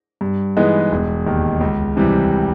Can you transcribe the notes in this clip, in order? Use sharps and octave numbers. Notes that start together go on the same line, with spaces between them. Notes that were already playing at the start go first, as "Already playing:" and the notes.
G2
E3 G#3 B3 D#4
E1
D#2 D#3
C#2
C3 E3 G3